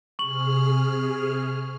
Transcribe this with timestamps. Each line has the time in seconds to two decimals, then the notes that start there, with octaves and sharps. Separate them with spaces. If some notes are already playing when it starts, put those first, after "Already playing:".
0.19 C3 G#4 C#6 F6 F#7